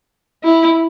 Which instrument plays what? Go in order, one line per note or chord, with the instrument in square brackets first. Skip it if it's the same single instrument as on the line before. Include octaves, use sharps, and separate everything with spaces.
[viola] E4